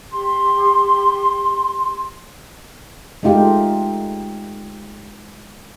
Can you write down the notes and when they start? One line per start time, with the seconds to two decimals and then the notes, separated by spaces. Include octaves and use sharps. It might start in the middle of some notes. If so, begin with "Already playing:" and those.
0.10 G4 C6
3.23 G#3 A3 D#4 F4 G4